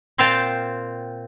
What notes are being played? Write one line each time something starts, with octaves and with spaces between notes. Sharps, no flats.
A#2 C4 F4 F5 G5 A5